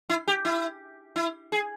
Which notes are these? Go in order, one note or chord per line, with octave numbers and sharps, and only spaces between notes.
E4
G4
E4
E4
G#4